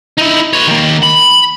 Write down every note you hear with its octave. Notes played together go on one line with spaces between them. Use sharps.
D#4 E4
B4 C#5
D#3 A#3
B5